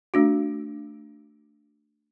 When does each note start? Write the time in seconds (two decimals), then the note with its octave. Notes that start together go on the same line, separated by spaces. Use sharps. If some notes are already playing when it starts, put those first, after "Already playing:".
0.14 A3 D4 F#4